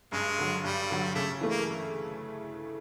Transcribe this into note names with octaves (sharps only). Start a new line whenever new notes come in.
G2 C#3 G#3
D3 F#3
G2 G3
D3 F#3
C#3 A3
E3 A3
A#3